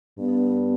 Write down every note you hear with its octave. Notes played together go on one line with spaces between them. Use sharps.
G2 B3